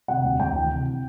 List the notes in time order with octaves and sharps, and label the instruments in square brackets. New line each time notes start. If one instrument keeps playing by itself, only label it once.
[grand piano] C3 F#5
D2
D2 G5
E3
C3